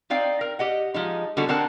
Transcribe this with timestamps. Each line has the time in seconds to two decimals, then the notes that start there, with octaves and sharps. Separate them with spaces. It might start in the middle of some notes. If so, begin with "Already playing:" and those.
0.10 C4 D#4 D5 F5 G5
0.41 A#4
0.59 G4 D#5 F#5
0.94 F3 G#3 D#4
1.37 D3 G3 B3 D#4 F#4 A4
1.48 D3 C4 A#4 F#5 G5 A5